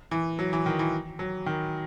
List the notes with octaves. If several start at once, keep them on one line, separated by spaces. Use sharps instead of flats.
E3
F#3
E3
D#3
E3
F#3
D#3